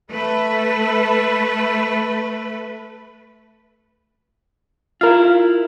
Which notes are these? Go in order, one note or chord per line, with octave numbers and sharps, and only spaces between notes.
A3 B4
E4 F4 A#4 F5